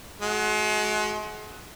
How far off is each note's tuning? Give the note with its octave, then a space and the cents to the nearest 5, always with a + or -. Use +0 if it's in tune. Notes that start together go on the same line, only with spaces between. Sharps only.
G#3 +40 F#4 +0